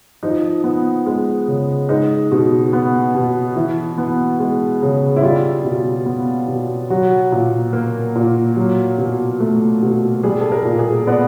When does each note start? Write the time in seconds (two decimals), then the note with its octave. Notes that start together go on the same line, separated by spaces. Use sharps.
0.23 F3 D#4
0.64 B3
1.06 G#3
1.48 C#3
1.89 G#3 D#4
2.32 B2
2.73 B3
3.15 B2
3.56 E3 E4
3.98 B3
4.39 G#3
4.82 C#3
5.16 E4
5.23 G3 F4
5.64 B2
6.06 B3
6.48 B2
6.90 F#3 F#4
7.32 A#2
7.73 A#3
8.15 A#2
8.57 F#3
8.98 B2
9.40 A3
9.83 B2
10.24 G3 G#4
10.41 A4
10.52 A#4
10.65 A#2
10.79 G#4
11.07 B3 D5